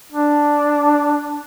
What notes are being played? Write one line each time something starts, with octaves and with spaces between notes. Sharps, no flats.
D4